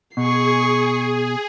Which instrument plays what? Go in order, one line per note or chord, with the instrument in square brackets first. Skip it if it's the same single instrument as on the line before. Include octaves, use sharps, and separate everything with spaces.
[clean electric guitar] B2 [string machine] G#4 [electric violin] C#6 C7